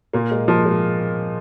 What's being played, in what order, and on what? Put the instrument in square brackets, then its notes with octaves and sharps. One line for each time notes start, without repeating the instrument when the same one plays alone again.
[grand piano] A#2 [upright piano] A#3
[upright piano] G#3
[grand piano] F3 [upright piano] A#3
[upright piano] G#3